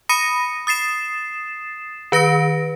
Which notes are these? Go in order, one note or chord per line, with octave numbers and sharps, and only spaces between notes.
B5 D#6 A#6 C#7 D#7
D#6 A6 C7 E7
D#3 B4 A#6 D7